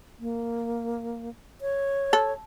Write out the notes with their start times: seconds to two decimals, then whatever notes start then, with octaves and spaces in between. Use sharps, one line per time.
0.20 A#3
1.61 C#5
2.13 A4